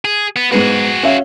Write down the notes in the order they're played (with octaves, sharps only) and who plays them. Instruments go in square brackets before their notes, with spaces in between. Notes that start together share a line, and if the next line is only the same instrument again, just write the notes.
[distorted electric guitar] G#4
B3
[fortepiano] G#2 G#3 B3 [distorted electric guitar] F#4 G#4
[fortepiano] C#4 E5 F5